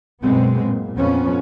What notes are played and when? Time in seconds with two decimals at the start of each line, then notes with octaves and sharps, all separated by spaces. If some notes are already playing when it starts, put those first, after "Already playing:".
0.23 F#2 B2 G#3 B3 C4
0.64 A#2
0.97 F2 F3 B3 C#4